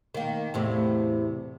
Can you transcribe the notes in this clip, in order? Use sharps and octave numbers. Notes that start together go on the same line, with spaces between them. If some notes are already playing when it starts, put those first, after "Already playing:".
D#3 A#3
E2 A2 C3